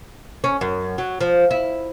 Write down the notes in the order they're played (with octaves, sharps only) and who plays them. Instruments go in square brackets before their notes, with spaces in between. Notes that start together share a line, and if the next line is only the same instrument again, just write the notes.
[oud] C#4
F#2
F#3
F3
E4